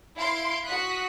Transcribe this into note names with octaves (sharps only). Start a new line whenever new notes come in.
E4 F5 C6 D7
F#4 D#6 F#6 B6